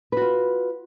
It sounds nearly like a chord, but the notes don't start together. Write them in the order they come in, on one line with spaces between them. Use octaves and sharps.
B4 F#4 F4